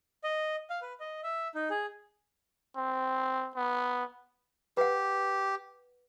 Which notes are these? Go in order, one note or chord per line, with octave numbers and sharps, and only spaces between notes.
D#5
F5
B4
D#5
E5
D#4
G#4
C4
B3
G4 B4 F#5